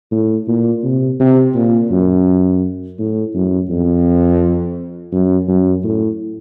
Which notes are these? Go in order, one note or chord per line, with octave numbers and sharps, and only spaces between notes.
A2
A#2
C3
C3
A#2
F#2
A2
F#2
F2
F#2
F#2
A2